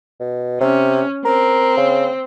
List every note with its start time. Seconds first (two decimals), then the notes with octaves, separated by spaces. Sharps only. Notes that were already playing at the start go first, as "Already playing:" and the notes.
0.20 B2
0.61 C3 C#4
1.25 C4 A#4
1.77 C#3